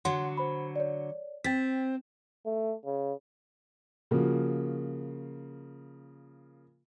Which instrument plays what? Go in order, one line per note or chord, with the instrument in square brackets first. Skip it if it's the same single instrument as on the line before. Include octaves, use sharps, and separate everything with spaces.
[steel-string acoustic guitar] D3 F#3 [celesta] C#5 F#5 C6
[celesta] C5 B5
C#5 D5
[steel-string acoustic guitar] C4 [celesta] G5 A6 B6
[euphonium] A3
C#3
[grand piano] C#3 F3 A#3 F#4